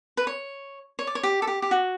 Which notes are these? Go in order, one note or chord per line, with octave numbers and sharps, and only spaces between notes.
B4
C#5
C#5
D5
C#5
G4
A4
G4
G4
F#4